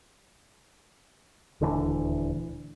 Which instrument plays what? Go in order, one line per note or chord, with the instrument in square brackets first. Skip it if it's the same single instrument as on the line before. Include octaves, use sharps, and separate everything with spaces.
[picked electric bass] D#1 D2 D3 E3